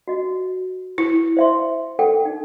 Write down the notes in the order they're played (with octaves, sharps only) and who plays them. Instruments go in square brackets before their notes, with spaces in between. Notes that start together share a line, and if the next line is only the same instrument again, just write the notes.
[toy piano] F#4 D#5
[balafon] E4
[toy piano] C5 E5 C6
A4 F#5 G5
D#4